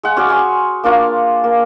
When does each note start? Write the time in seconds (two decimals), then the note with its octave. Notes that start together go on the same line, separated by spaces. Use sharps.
0.03 G#3 F#5
0.17 C#4 F#4 G#4 D5
0.29 G#5 C6 C#6
0.83 A#3 D4 F4 C#5
1.44 A#3